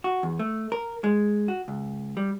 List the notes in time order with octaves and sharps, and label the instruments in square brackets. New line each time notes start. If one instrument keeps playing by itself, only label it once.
[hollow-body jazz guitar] F#4
E2
A3
A#4
G#3
F#4
C#2
G3